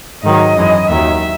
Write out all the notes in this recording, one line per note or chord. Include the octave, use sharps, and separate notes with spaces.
G#2 D#3 F#3 D#5
F#2 E3 G#3
D#2 D#3 F#3 E5